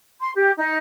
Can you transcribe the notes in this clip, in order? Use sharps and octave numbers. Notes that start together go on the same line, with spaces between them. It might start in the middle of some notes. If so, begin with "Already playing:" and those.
C6
G4
D#4